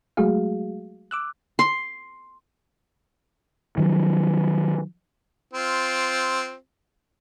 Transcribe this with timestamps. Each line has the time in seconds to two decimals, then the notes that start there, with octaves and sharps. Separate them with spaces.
0.17 F#3 G#3 A3 F#4 G#4 F5
1.11 D6 E6 F#6
1.59 C6
3.78 D#3 F3 F#3
5.54 C4 F4